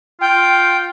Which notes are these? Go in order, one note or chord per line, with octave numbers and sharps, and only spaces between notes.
F4 G5